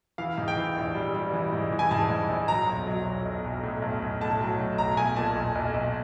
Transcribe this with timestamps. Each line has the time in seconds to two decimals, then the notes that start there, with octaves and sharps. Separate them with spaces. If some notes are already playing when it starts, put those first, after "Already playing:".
0.18 E3 F5
0.38 G#2
0.48 G5
0.57 E3
0.76 A#1
0.95 G3
1.14 G3
1.33 E3
1.53 G#2
1.72 E3
1.79 G#5
1.91 G#2 A5
2.10 G#2
2.29 A#1
2.48 F#3 A#5
2.67 B1
2.87 F#3
3.06 B1
3.25 B1
3.44 B1
3.63 A2
3.82 B1
4.02 B1
4.21 A2 A5
4.40 F#3
4.59 A2
4.78 B1 A#5
4.97 B1 G#5
5.16 A#2 A5
5.36 B1
5.55 B1
5.74 B1